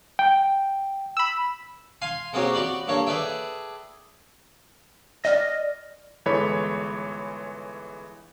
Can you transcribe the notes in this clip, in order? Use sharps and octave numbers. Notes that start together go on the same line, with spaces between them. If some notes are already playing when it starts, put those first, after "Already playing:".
G5
B5 E6
F5 G#5 C6
G#3 A#3 C4 C#4 F#4 G4
F#4 G4 D5 B5
G2 A#3 A4 C#5
G#4 A4 B4 D5 E5 G5
D5 D#5 F6
G1 E3 G#3 A4 C#5 B5